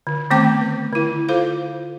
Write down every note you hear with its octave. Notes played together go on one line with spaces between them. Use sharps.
D3
D#3 A3 B3 C4 G5 D6
B4
D3 E4
F4 A4 C5 F5